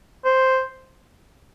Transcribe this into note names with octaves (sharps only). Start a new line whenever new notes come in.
C5